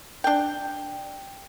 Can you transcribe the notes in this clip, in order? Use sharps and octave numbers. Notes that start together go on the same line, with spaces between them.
D4 G5